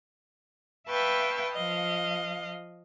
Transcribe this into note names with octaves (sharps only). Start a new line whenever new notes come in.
B4 E5 F5 G5 A5 C#6
F3 D#5 F5